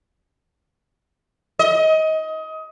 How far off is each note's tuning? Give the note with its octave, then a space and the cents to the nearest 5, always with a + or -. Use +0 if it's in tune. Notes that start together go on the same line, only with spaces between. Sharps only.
D#5 +25